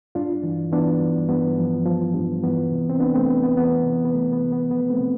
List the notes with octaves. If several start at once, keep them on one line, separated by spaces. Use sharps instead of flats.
G2 D4 F4
E3
E3 B3 D4
G2
G2 B3
F3
F3
G2
E3 B3
C3
C4
C2 B3 D4
A3 C4
C2 B3
B3
E3 B3
C3
B3
C2 A3
B3
C2
B3
F3 B3
A3 C4
C3